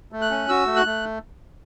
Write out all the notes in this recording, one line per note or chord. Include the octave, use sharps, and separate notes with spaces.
A3
F#6
C#4
F#4 E6
A3
F#6
A3